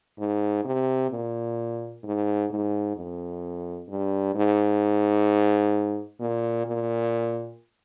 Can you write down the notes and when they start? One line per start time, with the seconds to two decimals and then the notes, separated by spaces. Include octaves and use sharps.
0.19 G#2
0.65 C3
1.11 A#2
2.04 G#2
2.50 G#2
2.97 F2
3.89 G2
4.35 G#2
6.20 A#2
6.67 A#2